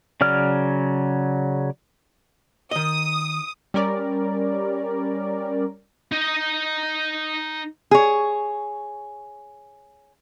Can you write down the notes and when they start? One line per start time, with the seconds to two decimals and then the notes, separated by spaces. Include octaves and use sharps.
0.21 C#3 F#3 D5 F6
2.71 D#3 D#5 D#6
3.74 G3 C#4 A#4 D5
6.12 D#4 D#5
7.91 G#4 C#5